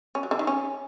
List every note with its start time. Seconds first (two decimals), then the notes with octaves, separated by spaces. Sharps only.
0.15 C#4
0.23 F#3
0.31 D3
0.39 D#3
0.47 C#4